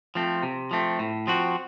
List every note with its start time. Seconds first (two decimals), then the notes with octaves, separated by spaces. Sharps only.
0.15 F3 A3 C4
0.43 C3
0.71 F3 A3 C4
0.99 A2
1.27 F3 C4 F#4